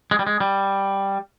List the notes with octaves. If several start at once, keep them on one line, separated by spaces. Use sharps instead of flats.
G#3
G3
G#3
G3